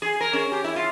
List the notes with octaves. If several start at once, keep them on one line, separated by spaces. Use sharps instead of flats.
G#4
A#4
C#4
G4
E4
F4